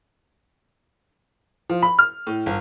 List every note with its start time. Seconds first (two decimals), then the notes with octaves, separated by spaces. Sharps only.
1.70 F3
1.83 B5
1.99 F6
2.27 A2
2.46 G1